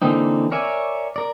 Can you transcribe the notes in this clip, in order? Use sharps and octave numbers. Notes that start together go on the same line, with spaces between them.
D3 E3 A#3 C4 D#4
A#4 C#5 D5 E5 G#5
A#4 D5